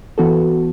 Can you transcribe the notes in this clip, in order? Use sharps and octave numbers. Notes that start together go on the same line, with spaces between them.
E3 B3 F#4 A4